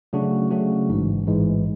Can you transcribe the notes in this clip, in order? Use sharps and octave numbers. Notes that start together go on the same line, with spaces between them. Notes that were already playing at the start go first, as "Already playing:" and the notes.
C#3 F#3 A3 D4 F#4
C#3 F#3 A3 D4 F#4
A1 G#2 E3 G#3
A1 G#2 E3 G#3